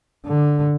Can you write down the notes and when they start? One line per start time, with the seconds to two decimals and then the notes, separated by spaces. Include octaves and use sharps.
0.25 D3